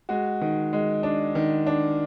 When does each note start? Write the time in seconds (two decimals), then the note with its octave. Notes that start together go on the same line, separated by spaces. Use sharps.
0.09 G#3 F#4
0.41 D#3
0.73 G#3
1.03 D4
1.35 D#3
1.66 D4